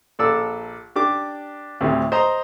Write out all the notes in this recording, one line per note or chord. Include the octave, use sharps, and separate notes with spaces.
A#1 A4 D5 E6
D4 G4 D6
D2 A2 C3
C5 D#5 A#5 C6